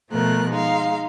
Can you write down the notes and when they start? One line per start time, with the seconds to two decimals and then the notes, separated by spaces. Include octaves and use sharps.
0.11 B2 F3 A3 A#4 F#6
0.49 G#3 D#4 F5